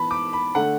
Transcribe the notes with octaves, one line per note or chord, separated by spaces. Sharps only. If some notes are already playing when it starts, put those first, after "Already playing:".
Already playing: E3 B3 A5 B5
D6
B5
D3 A3 D4 F#5